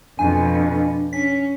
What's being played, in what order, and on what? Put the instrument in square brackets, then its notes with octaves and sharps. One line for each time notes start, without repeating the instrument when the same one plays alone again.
[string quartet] F2 B2 [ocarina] D4 [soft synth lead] G#5
[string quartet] C#4 [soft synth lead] B6